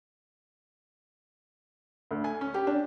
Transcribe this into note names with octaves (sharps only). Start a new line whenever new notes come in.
D2
G#5
C#4
G4
D4